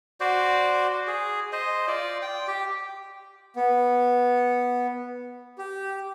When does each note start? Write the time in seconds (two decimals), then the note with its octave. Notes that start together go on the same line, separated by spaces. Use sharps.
0.20 F#4 C5 D5
1.07 G#4
1.53 C5 D#5
1.88 F4 D5
2.22 G5
2.48 G4
3.56 B3
5.58 G4